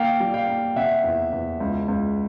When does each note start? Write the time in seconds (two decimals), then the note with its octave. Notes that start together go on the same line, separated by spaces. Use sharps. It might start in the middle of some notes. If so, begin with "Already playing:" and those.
Already playing: A#3 F5 G5
0.20 G3
0.34 F5 G5
0.48 A#3
0.76 C3 E5 F#5
1.04 E2
1.32 E2
1.60 C#2
1.88 C#2